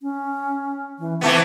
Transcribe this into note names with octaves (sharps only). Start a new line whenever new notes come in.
C#4
E3
E3 A3 B3 C4